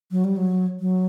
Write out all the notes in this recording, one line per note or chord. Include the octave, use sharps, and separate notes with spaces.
F#3
G3
F#3
F#3